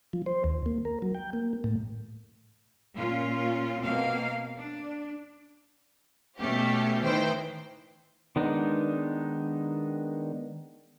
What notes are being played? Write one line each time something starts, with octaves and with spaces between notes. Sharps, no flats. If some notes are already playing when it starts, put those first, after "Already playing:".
F3
C5
D#2
A#3
A#4
F#3
G5
A#3
A2
A#2 C#4 F4
B2 A#3 C4 F5
D4
B2 A3 C#4 G4
A2 D#3 E3 C5 G5
D#3 G#3 B3 D4 D#4